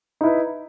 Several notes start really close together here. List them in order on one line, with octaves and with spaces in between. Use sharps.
D#4 E4 B4